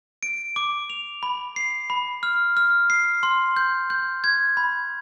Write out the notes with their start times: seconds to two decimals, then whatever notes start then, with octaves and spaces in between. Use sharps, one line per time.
0.23 D7
0.56 D6
0.90 F7
1.23 B5
1.56 C7
1.90 B5
2.23 F6
2.57 F6
2.90 C7
3.23 C6
3.56 G6
3.90 G6
4.24 G#6
4.57 B5